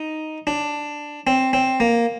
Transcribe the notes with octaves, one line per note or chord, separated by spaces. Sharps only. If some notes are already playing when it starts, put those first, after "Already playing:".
Already playing: D#4
D4
C4
C4
A#3